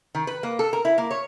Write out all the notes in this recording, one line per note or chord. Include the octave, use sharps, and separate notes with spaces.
D#3
B4
A#3
A4
A#4
E4
A#3
C#5